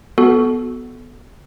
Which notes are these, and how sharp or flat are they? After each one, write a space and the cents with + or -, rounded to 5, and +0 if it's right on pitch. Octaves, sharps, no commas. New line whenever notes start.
B3 +0 F#4 +0 A4 -20